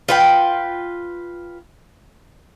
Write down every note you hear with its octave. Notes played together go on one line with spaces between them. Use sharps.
F4 B4 G5